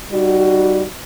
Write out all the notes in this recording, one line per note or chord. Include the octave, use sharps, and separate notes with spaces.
G3 D#4 F#4